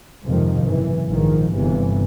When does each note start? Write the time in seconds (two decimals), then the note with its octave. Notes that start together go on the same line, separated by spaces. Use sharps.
0.24 F2 G#2 C3 D#3 F3
0.65 F#1 E3
1.10 A#1 G#2 D#3 F3
1.54 G1 C3 E3